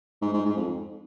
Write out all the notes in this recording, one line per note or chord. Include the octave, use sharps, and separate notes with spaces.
G#2
G#2
G#2
F2